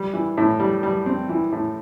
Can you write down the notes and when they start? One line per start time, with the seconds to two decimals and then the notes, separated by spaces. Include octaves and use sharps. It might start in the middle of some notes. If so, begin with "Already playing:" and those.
Already playing: G3
0.14 E3
0.37 A2
0.60 G3
0.83 G3
1.06 C4
1.29 E3
1.52 A2